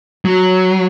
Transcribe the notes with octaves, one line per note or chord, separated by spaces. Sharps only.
F#3